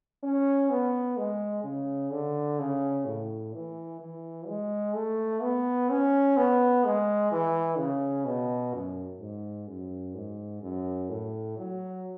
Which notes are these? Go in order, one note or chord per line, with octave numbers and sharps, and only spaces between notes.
C#4
B3
G#3
C#3
D3
C#3
A2
E3
E3
G#3
A3
B3
C#4
B3
G#3
E3
C#3
B2
F#2
G#2
F#2
G#2
F#2
A2
F#3